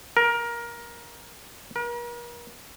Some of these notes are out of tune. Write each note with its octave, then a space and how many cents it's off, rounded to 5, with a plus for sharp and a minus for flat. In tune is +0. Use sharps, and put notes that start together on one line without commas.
A#4 +15
A#4 +40